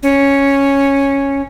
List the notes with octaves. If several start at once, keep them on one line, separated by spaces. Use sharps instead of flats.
C#4